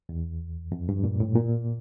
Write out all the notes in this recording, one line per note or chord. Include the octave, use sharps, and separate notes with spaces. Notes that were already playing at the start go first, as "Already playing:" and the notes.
E2
F2
G2
A#2
A2
A#2